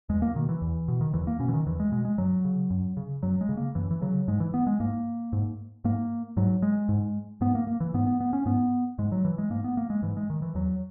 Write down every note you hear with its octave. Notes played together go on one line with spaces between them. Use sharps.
E2 G#3
A#3
B2 D#3
E3
E2
B2
D#3
E2 E3
A#3
B2 C#4
E3
D#3
E2 E3
G#3
B2 G#3
G#3
F#2 F#3
C#3
F#2
C#3
F#2 F#3
G#3
C#3
A#3
F#2 E3
E3
C#3 F#3
G#2 G#3
E3
B3
G#3
G#2 A#3
G#2
G#2 A#3
G#2 F#3
G#3
G#2
G#2 B3
A#3
A#3
E3
G#2 B3
B3
B3
C#4
G#2 B3
G#2 G#3
F#3
E3
G#3
G#2 A#3
B3
A#3
G#3
G#2 E3
G#3
D#3
E3
E2 F#3